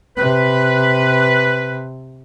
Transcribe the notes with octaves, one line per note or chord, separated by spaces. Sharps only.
C3 B4